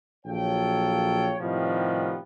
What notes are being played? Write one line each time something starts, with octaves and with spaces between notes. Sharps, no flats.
A#1 F#3 A4 C#5 F5 G5
A2 C3 D#3 F3 G3 B3